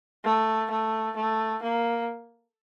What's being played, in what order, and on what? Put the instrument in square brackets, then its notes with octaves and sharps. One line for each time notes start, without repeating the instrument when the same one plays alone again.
[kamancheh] A3
A3
A3
A#3